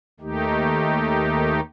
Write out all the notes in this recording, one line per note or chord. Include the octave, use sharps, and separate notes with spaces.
D#2 D#3 A3 D#4 G4